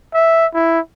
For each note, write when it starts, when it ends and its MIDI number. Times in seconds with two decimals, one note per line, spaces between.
0.14 0.46 76
0.54 0.80 64